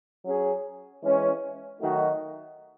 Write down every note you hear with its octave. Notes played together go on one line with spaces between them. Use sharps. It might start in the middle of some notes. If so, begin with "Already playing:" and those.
F#3 C#4 G#4
E3 G#3 C#4
D#3 F#3 A3 D#4 F#4